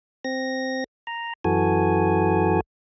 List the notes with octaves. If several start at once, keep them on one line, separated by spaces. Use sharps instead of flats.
C4 A#6
A#5
F#2 E3 F#4 A4 G#5